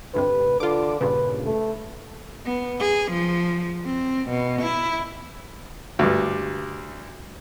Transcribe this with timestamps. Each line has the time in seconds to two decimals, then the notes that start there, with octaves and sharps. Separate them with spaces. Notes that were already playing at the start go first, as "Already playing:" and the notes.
0.14 D2 G2 C3 B4
0.60 D3 F4 D6
1.01 G2 A#2 C#3 B4
1.44 A3
2.45 B3
2.80 G#4
3.11 F3
3.86 C4
4.30 B2
4.62 E4
5.99 D2 G2